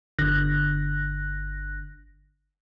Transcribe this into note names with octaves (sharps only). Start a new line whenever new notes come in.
G1 D3 F#6 A#6